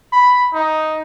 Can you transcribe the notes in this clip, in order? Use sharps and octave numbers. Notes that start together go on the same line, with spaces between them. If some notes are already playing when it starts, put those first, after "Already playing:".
B5
D#4